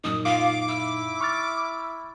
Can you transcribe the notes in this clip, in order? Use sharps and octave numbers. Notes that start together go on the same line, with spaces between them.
F#2 A#2 D#4 D#6
F4 F5 D6
E4 E6
C#6 F6 A6